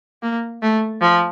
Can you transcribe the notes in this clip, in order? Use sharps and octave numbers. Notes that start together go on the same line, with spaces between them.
A#3
A3
F3